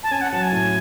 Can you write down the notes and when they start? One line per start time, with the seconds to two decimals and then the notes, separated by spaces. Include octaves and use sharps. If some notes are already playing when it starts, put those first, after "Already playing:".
0.03 A5
0.11 C#4 G#5
0.21 F#5
0.32 F#3 A5
0.42 G#5
0.52 A2